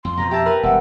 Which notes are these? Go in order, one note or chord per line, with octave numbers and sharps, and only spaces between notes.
F2 C6
F2 B2 F3 A#5
G4 E5 A5
A#4 B4
E1 G3 E5 F#5